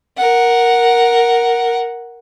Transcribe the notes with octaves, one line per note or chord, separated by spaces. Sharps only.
A#4 F#5